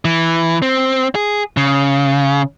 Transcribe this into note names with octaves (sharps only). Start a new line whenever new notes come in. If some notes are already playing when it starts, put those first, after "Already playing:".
E3
C4
G#4
C#3